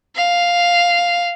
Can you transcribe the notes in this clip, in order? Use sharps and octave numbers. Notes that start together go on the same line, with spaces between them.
F5